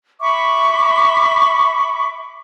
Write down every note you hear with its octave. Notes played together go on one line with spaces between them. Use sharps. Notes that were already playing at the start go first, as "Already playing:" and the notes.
E5 B5 C#6 D6